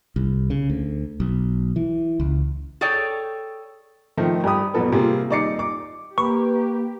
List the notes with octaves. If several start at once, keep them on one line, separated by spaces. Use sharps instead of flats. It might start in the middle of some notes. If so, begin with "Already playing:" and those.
C2
C#3
D2
B1
E3
C#2
G#4 A4 C#5 D5 G5
D#3 F3 A3 C4
G2 G4 B5 D#6
E1 B2 F#3 A4 B4
C3 G3 A#3 F4 G#4
D#1 D#4 D5 D6 C7 C#7
D6
A#3 G4 B4 C#6